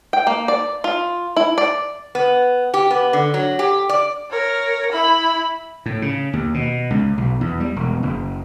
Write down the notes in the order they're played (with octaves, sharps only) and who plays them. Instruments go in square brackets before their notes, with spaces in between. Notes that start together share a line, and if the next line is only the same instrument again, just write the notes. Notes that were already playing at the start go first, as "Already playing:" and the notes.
[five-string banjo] G5
A#3
D5
F4
E4
D5
[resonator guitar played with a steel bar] B3
G4
B3
D3
F#3
G4
D5
[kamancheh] A#4 C#5
E4 B5
[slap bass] A2
C#3
D#2
B2
C#2
B1
E2
G3
E1
F#1